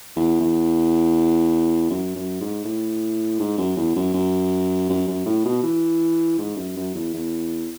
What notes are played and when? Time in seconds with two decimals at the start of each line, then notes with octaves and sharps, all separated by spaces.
0.16 E2
0.40 E2
1.90 F#2
2.15 F#2
2.41 G#2
2.64 A2
3.40 G#2
3.58 F#2
3.77 E2
3.96 F#2
4.14 F#2
4.89 F#2
5.07 F#2
5.26 A2
5.45 B2
5.63 E3
6.38 G#2
6.56 F#2
6.76 F#2
6.94 E2
7.13 E2